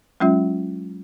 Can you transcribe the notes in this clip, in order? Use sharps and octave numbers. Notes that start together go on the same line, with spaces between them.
F#3 G#3 C#4 F4 E5